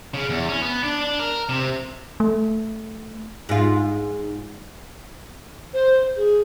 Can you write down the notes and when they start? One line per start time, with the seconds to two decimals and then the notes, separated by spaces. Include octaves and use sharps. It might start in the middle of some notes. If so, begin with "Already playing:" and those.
0.14 C#3
0.30 E2
0.49 C#4
0.62 B3
0.83 D4
1.01 D4
1.19 A#4
1.49 C3
2.20 A3
3.49 G#2 F4
5.74 C5
6.17 G#4